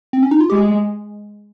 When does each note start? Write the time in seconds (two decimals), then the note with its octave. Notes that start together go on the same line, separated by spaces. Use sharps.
0.13 C4
0.23 C#4
0.31 D#4
0.40 F4
0.50 G#3 G4